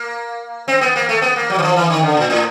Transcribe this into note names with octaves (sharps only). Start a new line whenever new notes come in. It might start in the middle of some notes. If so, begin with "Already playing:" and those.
Already playing: A#3
C4
B3
A#3
A3
B3
A#3
F#3
E3
F3
E3
D#3
D3
A#2
A2